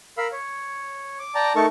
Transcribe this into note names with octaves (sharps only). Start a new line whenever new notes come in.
A#4 F5 B5 E6
C#5
D6
D5 G5 A5 A#5
A3 D#4 A4 A#4 A5 C#6